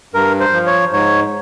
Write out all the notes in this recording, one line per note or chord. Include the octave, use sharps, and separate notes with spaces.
G2 A#4
C5
F3
C#5
G#2 C#5